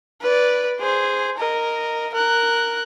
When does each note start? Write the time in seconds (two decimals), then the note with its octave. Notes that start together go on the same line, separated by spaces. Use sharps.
0.21 B4 D5
0.80 G#4 C5
1.37 A#4 D#5
2.14 A#4 F#6